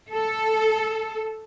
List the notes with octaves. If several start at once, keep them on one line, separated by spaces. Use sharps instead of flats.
A4